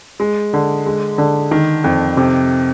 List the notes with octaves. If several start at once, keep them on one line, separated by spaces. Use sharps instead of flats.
G#3
D3
G#3
D3
D#3
F2
C3